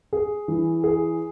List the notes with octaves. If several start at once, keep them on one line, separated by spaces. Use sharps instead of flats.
G#4
E3
G#4